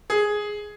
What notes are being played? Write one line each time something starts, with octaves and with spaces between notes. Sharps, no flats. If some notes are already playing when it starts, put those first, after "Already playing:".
G#4